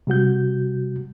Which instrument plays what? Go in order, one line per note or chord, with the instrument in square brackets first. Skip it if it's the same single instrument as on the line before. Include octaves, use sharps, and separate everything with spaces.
[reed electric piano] C3 G3 F#4 G6